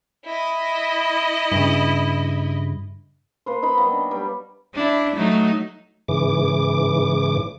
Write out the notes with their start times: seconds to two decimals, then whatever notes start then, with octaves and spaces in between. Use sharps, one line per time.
0.25 E4 D#5
1.52 G2 C#3
3.46 A#3 B4 C5
3.62 D#4 B4 D#5 B5
3.77 F#3 A#3 B3 G5
3.92 D4
4.11 G3 B4
4.74 D4 E4
5.16 F#3 A3 D#4
6.08 G#2 C#3 E3 D6